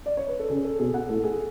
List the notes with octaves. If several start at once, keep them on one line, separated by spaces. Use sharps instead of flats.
D5
C#5
B4
A4
C#3 G#4
A4
B2 G#4
F#5
A2 A4
G#4